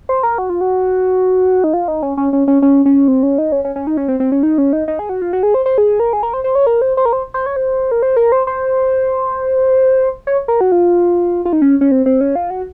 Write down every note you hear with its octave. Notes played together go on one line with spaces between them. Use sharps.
C5
A#4
F#4
F4
F#4
D#4
F4
D#4
C#4
C#4
C#4
C#4
C#4
C#4
C4
C#4
D#4
C#4
C#4
C#4
D#4
C#4
C4
C4
C#4
D#4
C#4
D#4
D#4
G#4
F#4
F4
F#4
G#4
C5
C5
G#4
A#4
G#4
A#4
C5
C5
C#5
A#4
C5
C5
A#4
C5
C5
C#5
C5
A#4
C5
A#4
C5
C5
C#5
A#4
F#4
F4
F4
D#4
C#4
C#4
C4
C4
C#4
F4
F#4